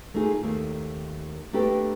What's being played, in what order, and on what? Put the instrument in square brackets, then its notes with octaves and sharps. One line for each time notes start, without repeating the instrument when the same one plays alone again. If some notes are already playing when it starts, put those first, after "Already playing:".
[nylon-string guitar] A3 A#3 D#4 F4 G#4
D#2 A3 A#3 D#4
A3 A#3 D4 G4 A4 B4